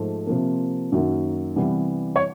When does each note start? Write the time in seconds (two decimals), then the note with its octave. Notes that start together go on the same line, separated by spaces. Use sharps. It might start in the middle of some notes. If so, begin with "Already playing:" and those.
Already playing: G#2 F3 A3
0.27 C3 F3 A#3
0.92 F#2 D#3 F#3 A#3
1.56 C3 E3 G3 B3
2.16 C#5